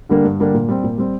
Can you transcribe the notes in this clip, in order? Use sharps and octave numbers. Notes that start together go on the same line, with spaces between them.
D3 G3 A#3 D4
G2
D3 G3 A#3 D4
A#2
G3 C4
A#2
G3 C4